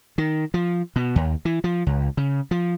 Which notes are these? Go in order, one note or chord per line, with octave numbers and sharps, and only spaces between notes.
D#3
F3
B2
D#2
E3
F3
C#2
C#3
F3